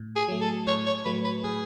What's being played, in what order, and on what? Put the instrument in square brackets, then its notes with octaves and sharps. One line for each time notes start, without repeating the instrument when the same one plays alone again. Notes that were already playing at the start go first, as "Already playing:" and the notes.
Already playing: [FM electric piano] A2
[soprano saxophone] G#4
[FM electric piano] F#3 A3
[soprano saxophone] A4
[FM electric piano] A2 [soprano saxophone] C#5
[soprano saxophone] C#5
[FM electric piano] F#3 A3 [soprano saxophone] B4
[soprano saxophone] B4
[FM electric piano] A2 [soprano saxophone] G#4